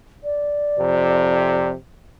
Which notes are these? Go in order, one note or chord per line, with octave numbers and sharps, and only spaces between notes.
D5
F2 C3